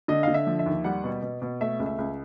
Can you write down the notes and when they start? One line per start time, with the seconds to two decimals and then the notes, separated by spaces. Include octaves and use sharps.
0.08 D3 D#5
0.23 D3 F5
0.34 E5
0.47 F3
0.59 E5
0.66 D#2
0.84 G3 F#5
1.04 B2
1.22 B2
1.42 B2
1.61 A3 E5
1.80 C#2
1.86 E5
1.98 C#2